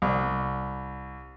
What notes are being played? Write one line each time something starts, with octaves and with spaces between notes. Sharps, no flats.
C2